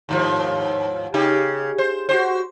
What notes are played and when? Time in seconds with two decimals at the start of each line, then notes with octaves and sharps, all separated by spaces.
0.09 D#2 G#2 F3
1.14 C#3 D#4 G4
1.78 C5
2.09 F#4 G4 C5